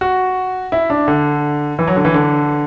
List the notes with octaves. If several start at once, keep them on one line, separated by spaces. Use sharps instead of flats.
F#4
E4
D4
D3
E3
F#3
D3
E3
D3